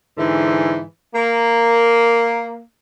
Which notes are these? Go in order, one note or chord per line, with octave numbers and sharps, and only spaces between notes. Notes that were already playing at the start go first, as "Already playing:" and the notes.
G#2 D3 E3
A#3